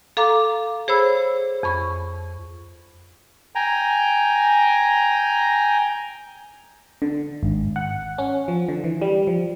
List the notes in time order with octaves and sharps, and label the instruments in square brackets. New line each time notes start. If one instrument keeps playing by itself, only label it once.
[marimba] A4 F5 A#5 D6
G#4 C5 C#5 B5 E6
F2 B5 C#6
[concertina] G5 G#5 A#5
[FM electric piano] D3
G#1
F#5
C#4
F3
D3
E3
G3
F3